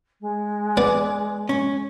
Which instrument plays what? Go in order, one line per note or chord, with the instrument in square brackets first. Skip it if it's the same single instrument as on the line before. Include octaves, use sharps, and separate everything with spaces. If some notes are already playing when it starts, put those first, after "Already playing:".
[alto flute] G#3
[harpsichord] B3 [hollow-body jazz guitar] D5
[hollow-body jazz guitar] C#4